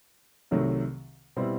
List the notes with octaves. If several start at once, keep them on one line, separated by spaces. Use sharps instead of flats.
C2 C3 D#3 F#3 A3
B2 G3 C4 E4